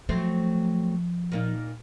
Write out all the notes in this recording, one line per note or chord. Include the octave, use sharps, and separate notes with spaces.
F3 F#3 A3 C4
A#2 A#3 D#4